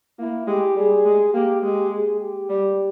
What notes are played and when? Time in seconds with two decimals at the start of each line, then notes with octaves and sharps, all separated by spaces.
0.19 A#3 E4
0.47 G#3 G4
0.76 G3 G#4
1.05 G#3
1.33 A#3 G4
1.62 G#3 G4
1.92 G#4
2.20 G4
2.49 G3